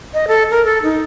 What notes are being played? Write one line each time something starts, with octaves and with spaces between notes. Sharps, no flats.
D#5
A4
A#4
A4
D#4